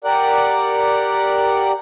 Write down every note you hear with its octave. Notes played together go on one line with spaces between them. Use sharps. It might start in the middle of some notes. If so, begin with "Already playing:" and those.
G4 A#4 D5 F#5